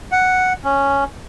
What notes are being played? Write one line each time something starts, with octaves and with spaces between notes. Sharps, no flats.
F#5
C#4